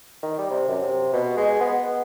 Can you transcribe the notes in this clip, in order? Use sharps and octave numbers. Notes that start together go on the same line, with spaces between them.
D#3
G3
C3
F#2
C3
B2
G#3
B3